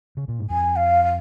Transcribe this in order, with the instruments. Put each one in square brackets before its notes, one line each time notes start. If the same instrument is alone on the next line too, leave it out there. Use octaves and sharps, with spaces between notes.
[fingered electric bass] C#3
A#2
G#2
[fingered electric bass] F2 [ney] G#5
[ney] F5
F5